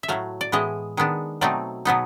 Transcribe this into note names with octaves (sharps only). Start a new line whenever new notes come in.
E5
A2 F#3 A3 F5
D5
A2 E3 G#3 B3 D#5
D#3 G#3 B3 D4
B2 F#3 A3 C4 D#4 D5
B2 F#3 B3 D#4